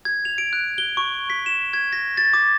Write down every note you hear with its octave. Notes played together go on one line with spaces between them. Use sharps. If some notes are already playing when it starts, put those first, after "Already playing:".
G#6
F7
D7
F#6
G7
C#6
B6
E7
G#6
A#6
A6
D6